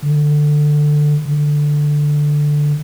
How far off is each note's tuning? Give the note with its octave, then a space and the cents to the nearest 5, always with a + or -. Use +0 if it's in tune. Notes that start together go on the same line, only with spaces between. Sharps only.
D3 +15
D3 +5